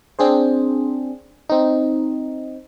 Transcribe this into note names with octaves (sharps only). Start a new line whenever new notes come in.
C4 D4 G#4 C5
C4 D#4